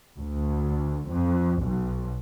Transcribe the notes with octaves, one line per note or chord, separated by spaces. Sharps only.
D2
F2
B1